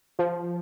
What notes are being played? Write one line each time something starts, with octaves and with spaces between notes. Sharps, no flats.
F3